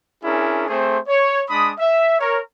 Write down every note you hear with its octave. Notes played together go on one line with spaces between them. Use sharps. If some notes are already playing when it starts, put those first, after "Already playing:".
C#4 D4 E4 G#4 A#4
A3 C4 G#4 C5
C#5
G#3 D4 B5 D#6
E5
A#4 C#5